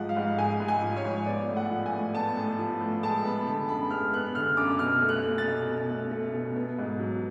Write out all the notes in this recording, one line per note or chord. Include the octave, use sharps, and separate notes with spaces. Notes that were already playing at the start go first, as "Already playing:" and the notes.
Already playing: G#2 F3 G#3 F#5
F5
G#2
G#3 G#5
G#2
G#5
F3
C#5
G#2
B3 D5
A2
F#5
F3
G#5
A2
B3 A5
A2
F3
A2
G#3 A5
B3 B5
D3 A5
F#2 B5
G#3 F6
B3 F#6
D3 F6
F#2 D6
B2 F6
A3
F#6
A3
A6
B2
B2
A3
A3
B2
B3
G#2
F#3